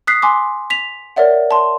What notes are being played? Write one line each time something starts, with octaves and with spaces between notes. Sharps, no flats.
D#6 F#6 B6 C7
G#5 C6 D6
B6 F7
A#4 C#5 D5 E5 F#5
A5 C6